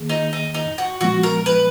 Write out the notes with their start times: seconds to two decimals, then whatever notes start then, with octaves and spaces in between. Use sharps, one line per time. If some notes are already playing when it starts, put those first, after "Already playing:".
Already playing: D#3 A#3 G#4
0.09 D#4
0.33 D#4
0.54 D#4
0.78 F#4
1.01 A#2 F3 G#3 B3 F#4
1.23 A#4
1.46 B4